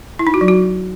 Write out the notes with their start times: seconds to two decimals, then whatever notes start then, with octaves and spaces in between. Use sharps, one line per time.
0.19 E4
0.27 D#4
0.34 F#4
0.41 F#3
0.48 F#4